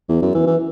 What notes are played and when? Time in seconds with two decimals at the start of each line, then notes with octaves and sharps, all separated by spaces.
0.09 E2
0.22 F#2
0.34 E3
0.47 E3